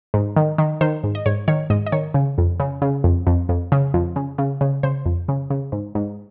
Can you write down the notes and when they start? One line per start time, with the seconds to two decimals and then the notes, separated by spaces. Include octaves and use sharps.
0.14 G#2
0.36 D#3
0.58 D#3
0.81 D#3 C5
1.04 G#2
1.15 D#5
1.26 G#2 C#5
1.48 D#3 C#5
1.70 G#2 D#5
1.86 D#5
1.92 D#3 C#5
2.14 C#3
2.38 F2
2.60 C#3
2.82 C#3
3.04 F2
3.27 F2
3.49 F2
3.72 C#3
3.94 F2
4.16 C#3
4.38 C#3
4.61 C#3
4.83 C#3 C5
5.05 F2
5.28 C#3
5.50 C#3
5.72 G#2
5.95 G#2